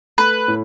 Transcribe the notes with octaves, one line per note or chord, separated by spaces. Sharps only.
A3 B4
A2